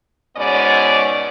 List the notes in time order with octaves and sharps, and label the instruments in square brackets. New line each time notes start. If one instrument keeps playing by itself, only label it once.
[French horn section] G#2 B2 B3 C#4 C#5 D5